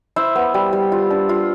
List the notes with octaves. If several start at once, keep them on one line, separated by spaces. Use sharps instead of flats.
E4 C5 E5
B3
G3
G3
F4
D4
F4